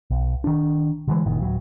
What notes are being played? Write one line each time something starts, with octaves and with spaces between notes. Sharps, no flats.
B1
D#3 D4
D3 E3 G#3
F#1 A#2 D#3
D1 F#3